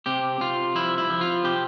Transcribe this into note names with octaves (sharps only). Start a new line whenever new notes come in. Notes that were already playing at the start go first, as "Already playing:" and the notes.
C3 G4
C3 F4
F3 E4
E4
F3
F4
C3 G4